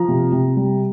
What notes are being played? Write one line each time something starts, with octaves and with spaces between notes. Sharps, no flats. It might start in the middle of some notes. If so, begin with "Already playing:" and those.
Already playing: F3 A#5
C3
C3
G3